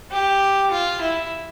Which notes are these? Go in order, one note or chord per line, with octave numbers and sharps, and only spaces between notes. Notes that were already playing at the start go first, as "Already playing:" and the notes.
G4
F4
E4